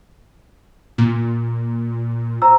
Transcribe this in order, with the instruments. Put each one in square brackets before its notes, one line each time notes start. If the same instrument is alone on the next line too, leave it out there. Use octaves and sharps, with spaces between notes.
[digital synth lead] A#2
[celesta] C5 A#5 E6